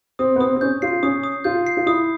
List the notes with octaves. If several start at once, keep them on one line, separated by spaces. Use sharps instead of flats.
C4 D#6
B3
C4 D#6
C4
C#4 G6
F4 C7
C#4 D#6
D#6
F4 G6
C7
F4
E4 D#6